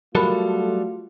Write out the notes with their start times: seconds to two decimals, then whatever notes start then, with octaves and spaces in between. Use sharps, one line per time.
0.15 F#3 G3 A3 F4 F#4 A4 A#4 B5